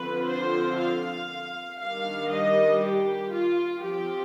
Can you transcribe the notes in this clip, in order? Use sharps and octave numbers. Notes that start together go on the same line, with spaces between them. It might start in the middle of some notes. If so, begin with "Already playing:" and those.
Already playing: D3 F3 C4 F4 B4
C5
F5
D#3 G3 D4 F5
D#5
G4
F4
F3 C4 F4 G4